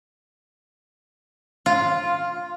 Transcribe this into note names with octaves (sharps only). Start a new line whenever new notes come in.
F4